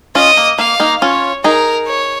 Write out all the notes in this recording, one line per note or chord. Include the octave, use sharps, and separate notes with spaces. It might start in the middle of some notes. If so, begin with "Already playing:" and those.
C#4 F4 D#5
A#3
A#3 F5
A#3 D#4
C#4 F4 C#5
D#4 G#4 A#4
C#5